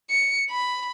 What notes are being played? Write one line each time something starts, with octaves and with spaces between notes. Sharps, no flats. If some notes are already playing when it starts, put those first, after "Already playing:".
C#7
B5